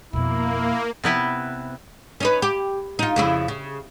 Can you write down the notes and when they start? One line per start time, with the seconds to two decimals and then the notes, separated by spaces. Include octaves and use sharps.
0.13 F2 B2 A#3 E4
1.04 C3 B3 E4 B4
2.20 C#4 D#4 B4
2.42 G4
2.99 D#4 F4
3.16 F2 C#3 E4
3.48 C#3